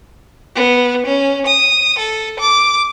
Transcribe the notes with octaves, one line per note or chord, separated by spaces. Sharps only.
B3
C#4
D#6
A4
D6